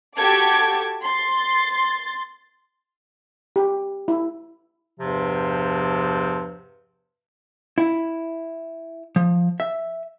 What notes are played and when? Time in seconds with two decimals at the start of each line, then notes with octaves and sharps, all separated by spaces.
0.17 F#4 G4 A4 A5 D6 G#6
1.02 C6 A6
3.56 G4
4.08 E4
5.00 E2 G2 C3 F3
7.78 E4
9.16 F3
9.60 E5